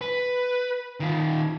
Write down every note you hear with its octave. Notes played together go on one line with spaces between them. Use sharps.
B4
D#3 F4